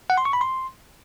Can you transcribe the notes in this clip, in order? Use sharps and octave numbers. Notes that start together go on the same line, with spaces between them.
F#5
C6
C#6
B5
C6